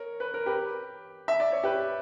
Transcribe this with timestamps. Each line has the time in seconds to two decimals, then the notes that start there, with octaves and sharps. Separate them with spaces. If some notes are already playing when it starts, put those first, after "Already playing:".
Already playing: A#4 C#5
0.20 B4
0.34 A#4
0.46 G4 B4
1.28 E5
1.40 D5
1.52 C#5
1.63 G4 B4